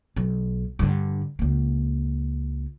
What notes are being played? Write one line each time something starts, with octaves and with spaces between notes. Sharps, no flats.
B1
G2 D3
C#2 A#3